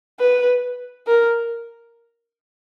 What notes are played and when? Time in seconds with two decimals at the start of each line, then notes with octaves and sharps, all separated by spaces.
0.20 B4
1.07 A#4